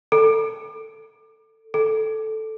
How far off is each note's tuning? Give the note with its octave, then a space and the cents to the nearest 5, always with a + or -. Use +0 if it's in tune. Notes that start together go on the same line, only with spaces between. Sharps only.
A4 +10
A4 -10